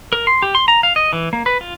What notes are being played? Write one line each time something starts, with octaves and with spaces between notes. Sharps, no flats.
A#4
C6
G4
C6
A#5
F5
D#5
E3
A#3
B4
F4